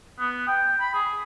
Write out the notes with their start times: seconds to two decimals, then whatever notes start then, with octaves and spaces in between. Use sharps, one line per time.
0.19 B3
0.47 G5
0.80 B5
0.94 G#4